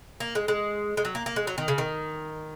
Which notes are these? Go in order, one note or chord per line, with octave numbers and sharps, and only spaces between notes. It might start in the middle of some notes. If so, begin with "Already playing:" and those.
A#3
G#3
G#3
G#3
F#3
A#3
A#3
G#3
F#3
D#3
C#3
D#3